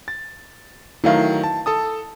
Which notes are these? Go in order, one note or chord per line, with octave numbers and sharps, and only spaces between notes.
A6
D#3 F#3 A3 E4 F5
A5
A4 A5 D#6